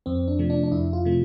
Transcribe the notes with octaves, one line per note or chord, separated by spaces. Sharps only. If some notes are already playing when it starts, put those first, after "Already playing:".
F2 C4
D4
C3 F3 A3
D4
D4
F2 E4
F4
C3 F3 A3